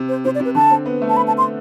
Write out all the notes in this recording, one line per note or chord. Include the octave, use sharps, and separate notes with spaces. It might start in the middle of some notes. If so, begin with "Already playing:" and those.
Already playing: C3
C5
C3 C5
D5
C3
B4
D3 A5
C4
B3
A3
A5
B5
A5
C6